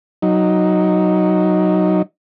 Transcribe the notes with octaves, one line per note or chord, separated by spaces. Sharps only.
F#3 D#4